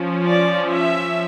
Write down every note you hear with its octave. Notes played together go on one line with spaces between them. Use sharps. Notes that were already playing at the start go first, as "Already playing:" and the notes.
Already playing: F3 C#4
D5
E5